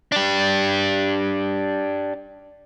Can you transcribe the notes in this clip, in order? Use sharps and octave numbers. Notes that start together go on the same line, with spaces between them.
D4 G4